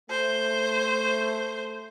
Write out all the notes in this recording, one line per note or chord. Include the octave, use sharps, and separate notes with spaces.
A3 C5